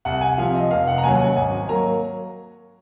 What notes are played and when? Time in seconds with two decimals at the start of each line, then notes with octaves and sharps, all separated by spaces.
0.05 C2 F#5
0.21 G#5
0.38 C3 F3 F5
0.54 D#5
0.70 F1 F5
0.87 F#5
0.98 A#5
1.03 D#2 C#3 F#3 G#5
1.20 F#5
1.36 G#1 G#5
1.69 F#3 A#3 A#5